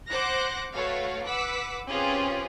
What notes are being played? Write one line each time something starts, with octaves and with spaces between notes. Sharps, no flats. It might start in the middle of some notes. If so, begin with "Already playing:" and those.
C5 F#5 D6 F#6 A#6
A3 F#4 B4 C#5 F5
B4 F#5 D6 E6 B6
C4 C#4 F4 G4 G#4 B4